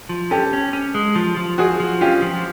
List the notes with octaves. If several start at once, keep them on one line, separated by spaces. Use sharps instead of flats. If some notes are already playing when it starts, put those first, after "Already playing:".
F3
C#4 G4 A4
C#4
C#4
G#3
F3
F3
F3 F#4 G#4
F3
C#4 F4 G4
F3